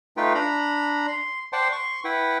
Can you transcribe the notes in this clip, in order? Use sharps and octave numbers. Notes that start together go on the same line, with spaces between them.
A3 D#4 F4 B4 G5
D4 A#5 B5
C6
C5 D5 F#5 G5 A5 C6
C6 C#6
E4 B4 F#5 G5